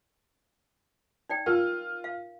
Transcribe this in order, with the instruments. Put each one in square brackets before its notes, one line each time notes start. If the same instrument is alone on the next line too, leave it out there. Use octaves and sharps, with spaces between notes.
[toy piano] D#4 D5 G5
[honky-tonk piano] F4 [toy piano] A#4
[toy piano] F5